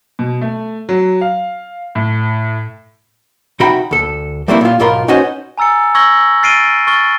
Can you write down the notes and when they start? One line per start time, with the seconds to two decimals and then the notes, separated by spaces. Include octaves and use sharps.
0.19 B2
0.41 A3
0.89 F#3
1.21 F5
1.95 A2
3.60 C3 D#4 F#4 G5 B5
3.91 D2 A4
4.48 G3 A3 A#3 C4 D4 E4
4.61 A#2 F4
4.80 B1 G#2 F4 A#4 B5 C6
5.08 C#4 D#4 F#4 B4 C5 D#5
5.58 G#5 A#5 E6 A6 C#7
5.95 C#6 E6 G#6 A#6 F#7 G7
6.42 F6 A6 C7 D7 D#7 G7
6.87 C#6 F6 A6 G7